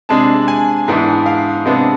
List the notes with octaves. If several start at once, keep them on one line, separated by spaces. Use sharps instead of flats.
C3 G#3 D4 A5
G#5
G#2 E3 B3 D4
F5
C3 G#3 B3 D4